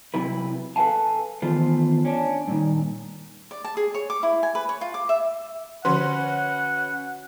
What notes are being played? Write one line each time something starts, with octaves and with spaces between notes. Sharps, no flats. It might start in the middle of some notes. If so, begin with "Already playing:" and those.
C3 F#3 E4 B4
A4 B4 C5 F5 G#5 A5
D#3 E3 A3 B3 F4 C5
C#4 D4
G2 A#2 D#3
D5
A5
G#4
C#5
D6
E4
G#5
B4
C#5
F4
D6
E5
D3 F3 C#4 F#4 B4 F#5 C6